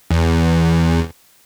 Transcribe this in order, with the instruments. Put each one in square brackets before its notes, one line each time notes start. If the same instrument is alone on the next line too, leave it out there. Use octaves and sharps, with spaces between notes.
[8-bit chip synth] E2